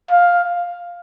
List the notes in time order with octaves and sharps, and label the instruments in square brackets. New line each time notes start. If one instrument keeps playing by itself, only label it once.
[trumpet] F5